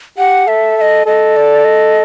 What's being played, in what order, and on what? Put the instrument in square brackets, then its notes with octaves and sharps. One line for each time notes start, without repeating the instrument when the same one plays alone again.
[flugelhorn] G4 [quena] F#5
[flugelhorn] A4 [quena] E5
[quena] E5
D#5
[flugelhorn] A4 [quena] D#5
[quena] D5
D#5